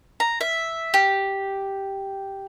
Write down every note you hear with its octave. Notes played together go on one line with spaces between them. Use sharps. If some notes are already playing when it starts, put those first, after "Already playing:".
A#5
E5
G4